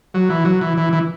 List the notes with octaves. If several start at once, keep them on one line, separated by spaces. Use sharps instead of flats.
F#3
E3
F#3
E3
E3
E3